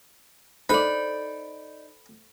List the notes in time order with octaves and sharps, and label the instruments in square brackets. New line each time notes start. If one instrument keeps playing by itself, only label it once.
[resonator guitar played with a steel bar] D#4 D5 [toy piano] A4 C5 [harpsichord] B5